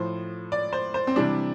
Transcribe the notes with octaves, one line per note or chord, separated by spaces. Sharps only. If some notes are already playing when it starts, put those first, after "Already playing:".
Already playing: A2 F3 C5
D5
C5
C5
C4
C3 E3 G3 D4